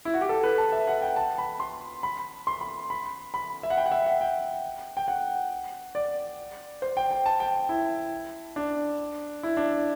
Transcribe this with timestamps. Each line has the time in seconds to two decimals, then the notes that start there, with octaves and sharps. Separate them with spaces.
0.05 E4
0.14 F#4
0.21 G4
0.29 A4
0.44 B4
0.58 A5
0.72 E5
0.87 F#5
1.02 G5
1.16 A5
1.38 B5
1.60 C6
2.03 B5
2.47 C6
2.61 B5
2.90 B5
3.34 B5
3.63 E5
3.70 F#5
3.77 G5
3.86 F#5
3.92 E5
4.06 F#5
4.21 G5
4.97 G5
5.08 F#5
5.95 D5
6.82 C5
6.97 G5
7.11 G5
7.26 A5
7.40 G5
7.69 E4
8.56 D4
9.43 E4
9.57 D4